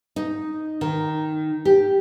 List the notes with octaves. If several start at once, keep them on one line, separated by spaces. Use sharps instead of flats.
D#4
D#3
G4